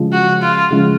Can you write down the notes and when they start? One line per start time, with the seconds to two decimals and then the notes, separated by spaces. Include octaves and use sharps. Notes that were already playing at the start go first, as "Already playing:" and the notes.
Already playing: C#3 F3 G#3
0.13 F#4
0.42 F4
0.70 C#3 F3 G#3